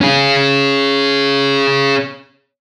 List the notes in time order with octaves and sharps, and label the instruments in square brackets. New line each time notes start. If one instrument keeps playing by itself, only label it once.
[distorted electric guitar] C#4 G#4